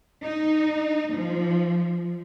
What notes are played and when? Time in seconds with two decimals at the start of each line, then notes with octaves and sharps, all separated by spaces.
0.23 D#4
1.14 F3